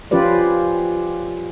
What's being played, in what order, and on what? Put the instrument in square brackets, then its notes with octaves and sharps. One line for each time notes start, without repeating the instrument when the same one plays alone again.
[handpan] F3 C#4 F4 G4 B4 D5